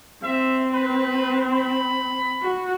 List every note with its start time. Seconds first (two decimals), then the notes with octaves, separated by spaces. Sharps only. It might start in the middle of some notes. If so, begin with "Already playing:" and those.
0.23 C4 E5
0.73 B4
1.53 B5
2.42 F#4